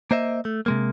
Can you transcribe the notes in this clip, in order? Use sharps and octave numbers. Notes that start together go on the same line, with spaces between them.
A#3 C5 D#5 E5
A3
C3 G#3 A#3